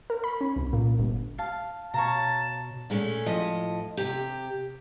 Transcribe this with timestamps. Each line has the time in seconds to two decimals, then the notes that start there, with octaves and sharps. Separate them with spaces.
0.10 A#4
0.24 B5
0.41 C#4
0.56 C2
0.73 A#2
0.99 G1
1.38 F5 A5
1.94 B2 C#5 F5 A5 A#5
2.90 A#2 G#3 A3 C#4
3.26 A2 F3 D#5
3.97 C3 G4